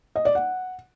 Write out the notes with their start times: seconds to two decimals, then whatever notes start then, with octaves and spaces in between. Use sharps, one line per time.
0.16 D#5
0.25 D5
0.35 F#5